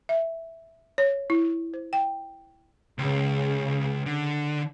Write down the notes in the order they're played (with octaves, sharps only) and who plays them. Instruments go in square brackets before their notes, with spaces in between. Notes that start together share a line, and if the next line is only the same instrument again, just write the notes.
[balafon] E5
C#5
E4
C5
G5
[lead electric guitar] C#2 [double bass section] C#3
[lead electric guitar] D3